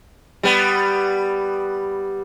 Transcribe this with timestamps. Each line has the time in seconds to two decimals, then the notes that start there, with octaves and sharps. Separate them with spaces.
0.43 G3 B3